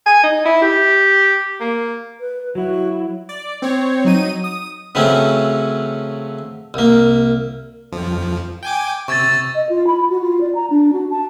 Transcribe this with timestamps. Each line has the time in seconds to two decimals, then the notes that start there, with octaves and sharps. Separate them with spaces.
0.06 G#5
0.23 D#4
0.46 E4
0.62 G4
1.60 A#3
2.20 B4
2.55 F#3 E4 F#4
3.29 D5
3.62 C4 C#5
4.05 F#3 D#4 D#7
4.44 D#6
4.95 C#3 E3 F#3 A3 C4 C#4
6.74 C2 A#3
7.92 F2 F3
8.63 G5 G#5 D6
9.08 C3 C#6 E6 G#6 A6
9.55 D#5
9.69 F4
9.87 B5
10.10 F#4
10.21 F4
10.41 D5
10.55 A#5
10.70 D4
10.93 F#4
11.11 A5